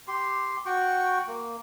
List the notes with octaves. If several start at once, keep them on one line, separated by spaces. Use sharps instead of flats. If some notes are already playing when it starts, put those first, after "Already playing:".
G4 C6
F#4 G5 C#6
A#3